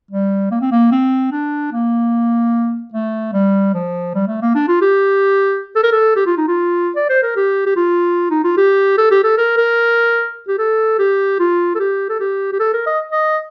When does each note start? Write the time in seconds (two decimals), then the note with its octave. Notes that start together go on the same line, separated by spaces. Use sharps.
0.11 G3
0.51 A#3
0.61 C4
0.72 A#3
0.92 C4
1.32 D4
1.73 A#3
2.93 A3
3.33 G3
3.74 F3
4.15 G3
4.27 A3
4.41 A#3
4.55 D4
4.68 F4
4.81 G4
5.76 A4
5.83 A#4
5.92 A4
6.16 G4
6.26 F4
6.38 D#4
6.48 F4
6.96 D5
7.09 C5
7.23 A#4
7.36 G4
7.66 G4
7.76 F4
8.31 D#4
8.44 F4
8.57 G4
8.98 A4
9.11 G4
9.24 A4
9.38 A#4
9.57 A#4
10.48 G4
10.58 A4
10.99 G4
11.39 F4
11.75 A4
11.79 G4
12.09 A4
12.20 G4
12.53 G4
12.60 A4
12.73 A#4
12.86 D#5
13.12 D#5